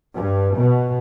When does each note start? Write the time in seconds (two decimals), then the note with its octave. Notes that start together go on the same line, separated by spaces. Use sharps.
0.16 G2
0.58 B2